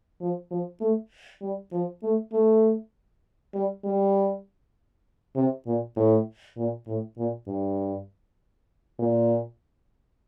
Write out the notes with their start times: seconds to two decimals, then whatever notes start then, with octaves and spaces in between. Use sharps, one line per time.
0.21 F3
0.51 F3
0.81 A3
1.42 G3
1.72 F3
2.03 A3
2.33 A3
3.54 G3
3.84 G3
5.36 C3
5.66 A#2
5.96 A2
6.57 A#2
6.87 A2
7.18 A#2
7.48 G2
8.99 A#2